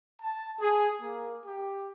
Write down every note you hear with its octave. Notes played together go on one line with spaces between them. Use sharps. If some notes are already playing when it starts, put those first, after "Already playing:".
A5
G#4
A#3
G4